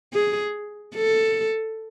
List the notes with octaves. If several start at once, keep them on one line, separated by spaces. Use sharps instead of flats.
G#4
A4